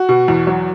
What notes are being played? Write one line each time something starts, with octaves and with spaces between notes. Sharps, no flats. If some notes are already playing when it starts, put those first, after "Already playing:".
Already playing: F#4
B2
E2
F#3